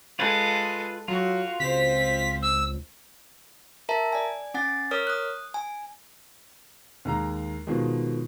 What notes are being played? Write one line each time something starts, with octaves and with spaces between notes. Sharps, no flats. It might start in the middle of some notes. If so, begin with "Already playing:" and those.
G#3 F4 A4 B4
F#3 F4 F#4
C#2 C4 C5 B6
E6
A#4 E5 A5 A#5
D5 G#5
C#4 F#5 G#5 A6
A#4 C#5 D#6 F6
D#6 F#6
G#5
D#2 G#3 A#5
B2 D#3 F3 G#3